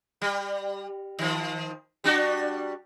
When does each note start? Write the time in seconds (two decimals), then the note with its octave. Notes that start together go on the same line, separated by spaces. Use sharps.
0.22 G3
1.19 D#3 F3
2.04 G3 D4 F#4